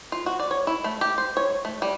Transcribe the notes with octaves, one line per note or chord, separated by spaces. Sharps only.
F4
F#4
D5
C#5
E4
A3
G4
C5
C#5
A3
G3